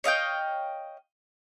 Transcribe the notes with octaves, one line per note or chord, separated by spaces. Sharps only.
C#5 D#5 F5 G5